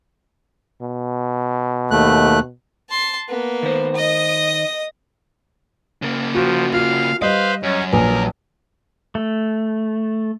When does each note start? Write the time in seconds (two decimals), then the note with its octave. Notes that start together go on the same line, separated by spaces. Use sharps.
0.81 B2
1.91 D#2 A3 F#6
2.90 A5 C6
3.29 A#3 B3
3.63 D#3 C5
3.96 D#5 D#6
6.02 C#3 A#3
6.35 F3 F#4
6.73 F4 F#4 F5
7.22 G3 B4 C5 D#5 F5
7.63 F#2 C#4
7.93 A#1 A#4 B4 G#5
9.15 A3